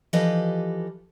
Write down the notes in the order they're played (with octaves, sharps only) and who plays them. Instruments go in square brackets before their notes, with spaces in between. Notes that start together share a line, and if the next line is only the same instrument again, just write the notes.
[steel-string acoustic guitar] E3 F3 G4 A4 B4 D#5